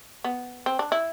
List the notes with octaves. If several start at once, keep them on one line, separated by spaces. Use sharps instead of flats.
B3
C4
D4
E4